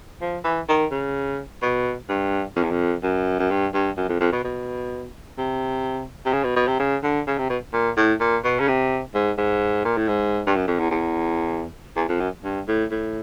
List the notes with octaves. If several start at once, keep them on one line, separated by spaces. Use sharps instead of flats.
F3
E3
D#3
C#3
B2
G2
F2
E2
F2
F#2
F#2
G2
G2
F#2
F2
F2
B2
B2
C3
C3
C#3
B2
B2
C3
C#3
D3
C#3
C3
B2
A#2
A2
A#2
B2
C#3
C3
G#2
G#2
A#2
A2
G#2
G2
F#2
F2
E2
E2
E2
F2
F#2
G2
A2
A2